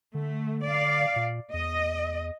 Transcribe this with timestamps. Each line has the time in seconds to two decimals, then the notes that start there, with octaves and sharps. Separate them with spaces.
0.14 D3 A3
0.64 D5 F5
1.16 A#2
1.54 E2 D#5